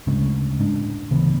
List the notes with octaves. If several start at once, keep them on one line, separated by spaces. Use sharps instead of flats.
D2 C#3 G#3 C#4
A2 G#3 D4
D2 C#3 E3 B3